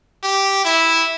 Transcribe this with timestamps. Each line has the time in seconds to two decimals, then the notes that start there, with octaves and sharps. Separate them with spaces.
0.23 G4
0.65 E4